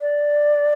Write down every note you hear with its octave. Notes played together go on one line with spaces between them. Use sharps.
D5